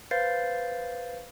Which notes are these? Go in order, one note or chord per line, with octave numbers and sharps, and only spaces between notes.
B4 C5 F5 G6 A6 C7